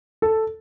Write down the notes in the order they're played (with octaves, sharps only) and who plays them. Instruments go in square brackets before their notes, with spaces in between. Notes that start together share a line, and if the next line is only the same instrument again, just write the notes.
[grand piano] A4